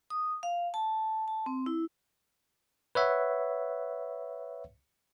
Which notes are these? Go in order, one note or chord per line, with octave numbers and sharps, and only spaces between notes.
D#6
F5
A5
A5
C4
E4
B4 C#5 E5 F#5